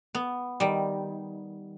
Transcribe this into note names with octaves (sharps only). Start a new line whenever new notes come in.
B3
D#3 G3